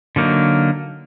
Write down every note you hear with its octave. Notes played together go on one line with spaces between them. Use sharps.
D3 F#3 A#3 D#4